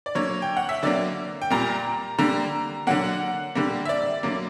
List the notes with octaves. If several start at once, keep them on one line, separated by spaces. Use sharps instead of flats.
D5
D3 F#3 A#3 C#5
G5
F#5
E5
D3 F#3 A#3 D5
G5
A#2 G3 A#3 A#5
D3 G3 A#3 A#5
D3 F#3 A#3 F#5
D3 G3 A#3
E5
D5
D3 F#3 A#3